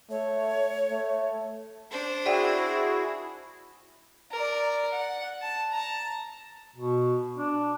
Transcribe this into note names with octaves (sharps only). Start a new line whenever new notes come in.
A3 C#5
A3
D4 C5
E4 F#4 G#4 D5 F#5 G5
A#4 D5
F#5
A5
A5 A#5
B2
D4